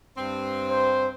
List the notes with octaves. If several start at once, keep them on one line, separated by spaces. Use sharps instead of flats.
G2 C4
C5